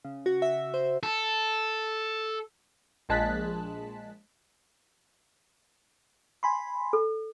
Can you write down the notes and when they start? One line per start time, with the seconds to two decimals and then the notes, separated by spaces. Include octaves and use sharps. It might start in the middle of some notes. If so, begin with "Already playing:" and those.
0.05 C#3
0.26 F#4
0.42 E5
0.74 C5
1.03 A4
3.09 A#1 G#3 A5 F#6 B6
6.43 G#5 B5 C6
6.93 A4